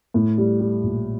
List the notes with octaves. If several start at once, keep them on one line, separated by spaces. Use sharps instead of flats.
A2
G3
G3
A#1